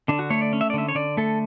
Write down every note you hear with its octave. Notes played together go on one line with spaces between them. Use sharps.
D3 D4
F#4
A3 C#5
D5
C#4
E5
D5
D3 E5
C#5
D3 D5
A3 A4